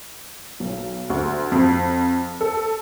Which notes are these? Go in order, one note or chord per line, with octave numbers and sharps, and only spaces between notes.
B1
D2
F2
A4